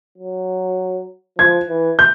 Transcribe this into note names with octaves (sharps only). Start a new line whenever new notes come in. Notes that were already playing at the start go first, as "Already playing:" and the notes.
F#3
F3 G#6
E3
G6